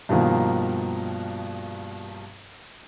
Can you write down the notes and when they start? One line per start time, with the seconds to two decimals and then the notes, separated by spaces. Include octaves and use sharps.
0.09 G2 B2 D#3 F3 A#3